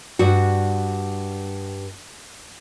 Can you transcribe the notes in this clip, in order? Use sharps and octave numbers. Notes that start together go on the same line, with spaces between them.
G2 F#4